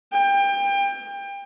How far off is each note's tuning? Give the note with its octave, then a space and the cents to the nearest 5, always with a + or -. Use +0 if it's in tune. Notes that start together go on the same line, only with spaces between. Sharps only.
G5 +25